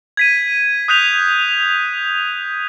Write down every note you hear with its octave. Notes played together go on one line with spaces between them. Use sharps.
G#6 B6 D#7
D#6 F#6 G6 B6 F7